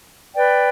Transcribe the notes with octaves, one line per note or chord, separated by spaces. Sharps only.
B4 D5 G5